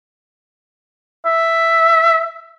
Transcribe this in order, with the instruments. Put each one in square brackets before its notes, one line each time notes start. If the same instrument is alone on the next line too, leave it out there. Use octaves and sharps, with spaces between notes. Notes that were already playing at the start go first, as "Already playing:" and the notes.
[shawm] E5